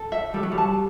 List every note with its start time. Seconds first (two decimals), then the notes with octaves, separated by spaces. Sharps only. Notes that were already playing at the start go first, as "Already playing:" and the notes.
Already playing: A4
0.12 E5
0.34 G3 A4
0.43 F#3
0.52 G3
0.58 A5